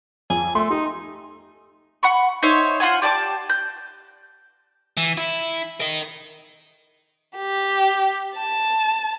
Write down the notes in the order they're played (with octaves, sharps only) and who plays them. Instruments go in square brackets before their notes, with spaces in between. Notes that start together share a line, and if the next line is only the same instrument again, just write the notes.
[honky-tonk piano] F2 [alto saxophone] G#5
[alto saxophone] A3 [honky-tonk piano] C6 E6
[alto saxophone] D#4 [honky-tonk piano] G4
[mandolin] F#5 B5 C#6
D#4 C5 C#5 E5
F4 C5 F#5 G#5
G4 D5 A5 D6
G6
[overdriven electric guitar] E3
E4
A#4 D#5
[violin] G4
A5